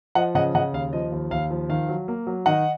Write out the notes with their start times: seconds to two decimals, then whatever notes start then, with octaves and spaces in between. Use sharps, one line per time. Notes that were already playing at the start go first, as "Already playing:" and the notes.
0.15 F3 D#5 F#5
0.35 C#3 D#5 F#5
0.55 C#3 D#5 F#5
0.73 D#2 F5
0.93 F3 D#5
1.12 D#2
1.31 D#2 F5
1.50 F3
1.69 D#3 F5
1.89 F#3
2.08 A#3
2.27 F#3
2.46 D#3 D#5 F#5